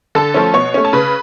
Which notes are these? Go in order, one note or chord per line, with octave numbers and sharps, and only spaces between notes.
D3 A4 A5
F3 A3 C#4
B2 C#5 C#6
A3 C#4
A5
C#3 B4 B5